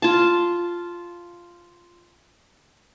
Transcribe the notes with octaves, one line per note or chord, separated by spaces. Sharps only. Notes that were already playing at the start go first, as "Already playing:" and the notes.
F4 A5